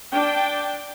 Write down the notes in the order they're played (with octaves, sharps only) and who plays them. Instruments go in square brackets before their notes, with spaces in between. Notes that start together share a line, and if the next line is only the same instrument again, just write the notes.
[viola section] D4 G5